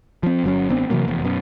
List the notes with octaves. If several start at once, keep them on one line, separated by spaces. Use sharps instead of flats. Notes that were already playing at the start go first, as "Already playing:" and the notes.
F3 C4
G1 F#3 C#4
A1 B3 C4 D4
C3 E3 F#3 A#3
F1 E2
F#2 B2